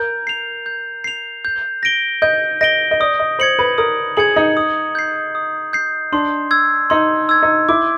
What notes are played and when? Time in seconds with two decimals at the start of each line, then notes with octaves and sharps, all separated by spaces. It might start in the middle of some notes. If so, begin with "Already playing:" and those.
Already playing: A#4 G6
0.27 C7 F7
0.66 G6
1.04 C7 F7
1.45 G6
1.83 A#6 D7 G7
2.22 D#5 G6
2.61 D#5 A#6 D7 G7
2.91 D#5
3.00 D5 D#6
3.19 D#5
3.39 C5 G#6 C#7 F#7
3.59 B4
3.78 A#4 D#6
4.17 G#4 G#6 C#7 F#7
4.36 D#4
4.57 D#6
4.95 G6 C7
5.35 D#6
5.73 G6 C7
6.12 D4 C6
6.51 E6 G#6
6.90 D#4 C6
7.29 E6 G#6
7.43 D#4
7.69 E4 D6